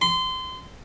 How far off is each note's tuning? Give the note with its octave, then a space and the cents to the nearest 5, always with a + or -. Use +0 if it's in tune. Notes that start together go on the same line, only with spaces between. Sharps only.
C6 -25